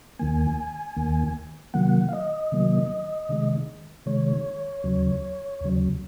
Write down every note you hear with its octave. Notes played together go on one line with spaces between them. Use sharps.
D#2 D#3 A#3 G#5
D#2 D#3 A#3
C3 D#3 F#3 A#3 F#5
F5
D#5
C3 D#3 F#3 A#3
C3 D#3 G#3
C3 D#3 G#3 C#5
D#2 C#3 F#3
D#2 C#3 F#3